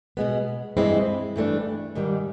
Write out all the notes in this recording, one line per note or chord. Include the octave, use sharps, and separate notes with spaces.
B2 G#3 B3
G2 E3 G#3 C4 E4
G2 E3 A3 D4
G#2 D#3 G3